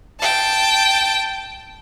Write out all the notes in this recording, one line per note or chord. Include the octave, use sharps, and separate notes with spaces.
G5 A5